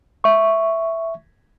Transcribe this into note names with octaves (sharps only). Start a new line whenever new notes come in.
E5 C#6